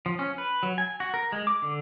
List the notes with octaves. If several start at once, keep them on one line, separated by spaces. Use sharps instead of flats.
F3
C#4
B4
F#3
G#5
F#4
A#4
G#3
D6
D3